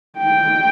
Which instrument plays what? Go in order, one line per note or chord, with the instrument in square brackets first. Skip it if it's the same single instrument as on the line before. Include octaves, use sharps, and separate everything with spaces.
[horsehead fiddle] G5